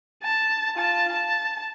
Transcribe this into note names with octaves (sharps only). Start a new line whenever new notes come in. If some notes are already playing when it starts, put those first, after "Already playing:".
A5
F4 A5
A5